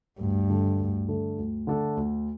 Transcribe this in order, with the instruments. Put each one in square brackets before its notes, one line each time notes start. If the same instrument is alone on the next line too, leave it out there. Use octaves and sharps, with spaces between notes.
[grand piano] D2 [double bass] G2
[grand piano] D3 A3 D4 A4
D2
D3 A3 D4 A4
D2
D3 A3 D4 A4
D2